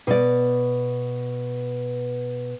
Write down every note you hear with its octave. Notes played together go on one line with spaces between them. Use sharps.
B2 D5